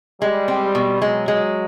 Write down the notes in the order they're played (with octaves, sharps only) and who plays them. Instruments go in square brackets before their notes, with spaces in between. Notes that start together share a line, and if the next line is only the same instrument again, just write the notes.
[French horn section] G3 [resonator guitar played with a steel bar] G#3
[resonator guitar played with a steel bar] C4
B2
[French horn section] F#3 [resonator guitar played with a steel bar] G#3
[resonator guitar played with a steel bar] G#3